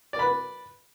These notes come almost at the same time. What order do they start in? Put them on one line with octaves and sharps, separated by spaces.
D5 A#4 B5 B4